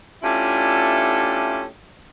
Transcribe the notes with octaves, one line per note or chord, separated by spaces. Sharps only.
A3 C#4 D4 E4 F4 G4